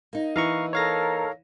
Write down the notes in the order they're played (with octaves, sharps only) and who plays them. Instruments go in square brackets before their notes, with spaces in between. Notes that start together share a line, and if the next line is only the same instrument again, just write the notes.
[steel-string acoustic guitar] A#3 D#4
[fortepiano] E3 [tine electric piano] F5 A#5 C#6
[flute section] A4 A#4 A#5 [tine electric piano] C#5 F5 A#6